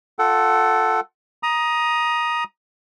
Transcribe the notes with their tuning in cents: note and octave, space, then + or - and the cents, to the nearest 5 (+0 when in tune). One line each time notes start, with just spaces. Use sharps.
F4 +10 A4 +0 F#5 +30
A#5 +20 D#6 +0